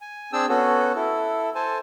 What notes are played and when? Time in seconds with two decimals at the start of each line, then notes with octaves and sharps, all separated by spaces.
0.01 G#5
0.33 C4 D4 G#4 G5 A5 E6
0.49 B3 C#4 F#4 A4
0.95 E4 A4
1.55 A4 C5 G#5 A5